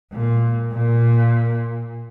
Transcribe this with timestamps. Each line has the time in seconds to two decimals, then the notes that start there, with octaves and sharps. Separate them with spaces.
0.12 A#2
0.72 A#2